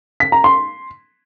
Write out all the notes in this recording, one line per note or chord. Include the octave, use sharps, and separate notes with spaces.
B6
A#5
C6